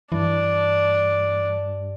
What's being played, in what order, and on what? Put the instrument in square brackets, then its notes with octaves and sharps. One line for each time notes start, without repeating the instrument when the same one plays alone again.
[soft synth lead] G2 [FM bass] E3 [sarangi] D4